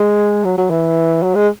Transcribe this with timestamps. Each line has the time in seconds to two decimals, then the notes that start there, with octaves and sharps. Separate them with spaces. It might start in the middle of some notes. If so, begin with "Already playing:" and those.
Already playing: G#3
0.45 F#3
0.58 F#3
0.70 E3
1.22 F#3
1.35 G#3